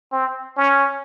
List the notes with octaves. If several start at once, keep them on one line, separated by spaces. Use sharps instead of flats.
C4
C#4